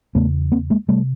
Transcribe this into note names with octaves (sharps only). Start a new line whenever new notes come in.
E2 C#3 A3 B3
A#3 C4
G#3 A#3
C3 G3 A3